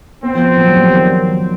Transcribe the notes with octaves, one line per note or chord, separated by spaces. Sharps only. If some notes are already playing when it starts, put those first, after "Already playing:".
B3 C4
F3
F#3
G3
G3
D#3